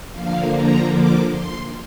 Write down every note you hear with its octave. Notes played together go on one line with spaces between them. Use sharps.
D3 F3 A#3 F5
A#5
D6
C6